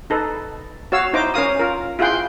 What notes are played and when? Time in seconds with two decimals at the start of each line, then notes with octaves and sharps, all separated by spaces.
0.10 D#4 A4 B4
0.92 F#4 C#5 F5 E6
1.13 D#4 E4 C5 A#5 D6
1.34 C#4 A#4 F5 D#6
1.59 F4 A#4
1.99 E4 F4 G#4 F#5 G5 C6